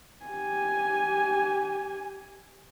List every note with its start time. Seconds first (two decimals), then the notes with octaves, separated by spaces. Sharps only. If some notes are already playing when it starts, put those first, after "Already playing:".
0.25 G4 G#5